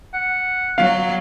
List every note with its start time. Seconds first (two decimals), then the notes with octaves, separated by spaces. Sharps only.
0.14 F#5
0.78 F#3 F5